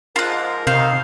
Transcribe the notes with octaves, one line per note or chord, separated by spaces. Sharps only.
G#2 F3 F4 A#4 F#6
F2 C3 D#3 C5 F5